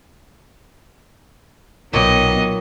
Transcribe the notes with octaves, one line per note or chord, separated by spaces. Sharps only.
B1 A#2 F#3 B3 D#4 C#5 D#5 G5